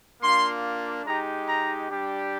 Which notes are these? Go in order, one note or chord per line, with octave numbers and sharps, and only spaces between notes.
A#3 D4 F4 C6
G#3 D#4 G4 A#5
A#5
G3 D4 G4